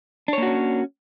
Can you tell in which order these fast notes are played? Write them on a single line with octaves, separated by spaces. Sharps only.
D4 C#5 A#3 F#4 C#4